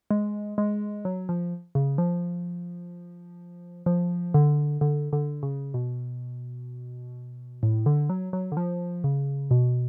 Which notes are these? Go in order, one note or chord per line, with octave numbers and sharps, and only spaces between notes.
G#3
G#3
F#3
F3
C#3
F3
F3
D3
D3
D3
C#3
B2
A2
D3
F#3
F#3
D3
F3
C#3
B2